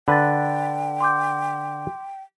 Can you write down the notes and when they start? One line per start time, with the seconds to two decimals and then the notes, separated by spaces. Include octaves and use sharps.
0.08 D3 B4 G5 B5 A6
1.00 C6 D6 G6